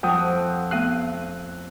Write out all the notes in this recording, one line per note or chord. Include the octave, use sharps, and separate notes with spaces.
F2 F#5 G5 D#6
A3 B3 F5 F#6